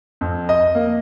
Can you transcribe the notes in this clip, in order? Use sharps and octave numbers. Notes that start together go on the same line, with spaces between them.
F2
D#5
A#3